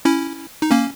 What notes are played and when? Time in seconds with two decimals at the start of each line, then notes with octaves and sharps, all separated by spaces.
0.05 C#4 E4
0.62 D#4
0.71 A#3 C#4